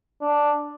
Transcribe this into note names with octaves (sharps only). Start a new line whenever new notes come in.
D4